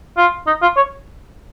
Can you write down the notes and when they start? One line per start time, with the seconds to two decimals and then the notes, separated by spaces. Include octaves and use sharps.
0.17 F4
0.47 D#4
0.62 F4
0.76 C#5